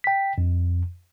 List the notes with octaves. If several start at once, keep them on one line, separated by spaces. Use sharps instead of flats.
G5 B6
F2